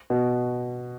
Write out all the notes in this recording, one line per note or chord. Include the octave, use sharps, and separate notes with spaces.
B2